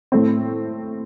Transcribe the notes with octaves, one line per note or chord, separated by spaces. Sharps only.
A2 A3 C4